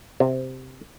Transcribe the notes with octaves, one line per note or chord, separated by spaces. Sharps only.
C3